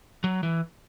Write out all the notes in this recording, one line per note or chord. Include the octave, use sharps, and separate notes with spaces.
F#3
E3